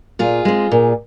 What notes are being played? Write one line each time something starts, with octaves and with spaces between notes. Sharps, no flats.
A#2 F4 G#4
G#3 C4
A#2